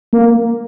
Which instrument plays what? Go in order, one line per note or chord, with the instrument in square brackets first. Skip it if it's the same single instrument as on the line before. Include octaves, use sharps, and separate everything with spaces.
[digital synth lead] A#3